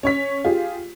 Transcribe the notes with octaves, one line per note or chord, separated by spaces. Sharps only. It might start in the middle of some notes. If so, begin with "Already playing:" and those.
C#4 C#5 B6
F4 G4 G#4